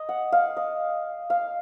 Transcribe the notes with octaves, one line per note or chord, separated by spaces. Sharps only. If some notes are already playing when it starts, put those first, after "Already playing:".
Already playing: D#5
F#5
F5
D#5
F5